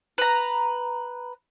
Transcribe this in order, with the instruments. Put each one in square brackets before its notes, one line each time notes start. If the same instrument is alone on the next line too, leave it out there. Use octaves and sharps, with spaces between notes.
[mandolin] B4 A#5